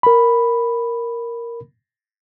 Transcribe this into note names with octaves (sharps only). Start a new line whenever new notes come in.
A#4 B5